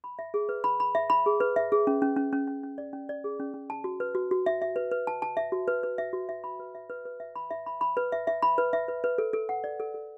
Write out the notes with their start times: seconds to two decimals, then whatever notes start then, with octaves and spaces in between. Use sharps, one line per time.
0.04 B5
0.19 E5
0.34 G#4
0.49 B4
0.64 B5
0.80 B5
0.95 E5
1.10 B5
1.26 G#4
1.40 B4
1.56 E5
1.72 G#4
1.87 C#4
2.02 C#4
2.16 C#4
2.33 C#4
2.47 C#4
2.63 C#4
2.78 D5
2.93 C#4
3.09 D5
3.24 G#4
3.40 C#4
3.54 C#4
3.70 A5
3.84 F#4
4.00 B4
4.15 F#4
4.31 F#4
4.46 E5
4.62 E5
4.76 B4
4.91 B4
5.07 A5
5.22 A5
5.37 E5
5.52 F#4
5.68 B4
5.83 B4
5.98 E5
6.13 F#4
6.29 E5
6.44 B5
6.60 B4
6.75 E5
6.90 B4
7.05 B4
7.20 E5
7.36 B5
7.51 E5
7.66 B5
7.81 B5
7.97 B4
8.12 E5
8.27 E5
8.42 B5
8.58 B4
8.73 E5
8.88 B4
9.04 B4
9.18 A4
9.33 A4
9.49 F#5
9.64 D5
9.80 A4
9.94 A4